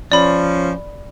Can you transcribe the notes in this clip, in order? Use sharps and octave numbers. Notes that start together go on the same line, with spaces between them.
F3 C#4 D5 B5